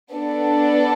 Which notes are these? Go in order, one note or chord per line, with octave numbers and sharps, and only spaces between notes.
B3 D4 A4 D5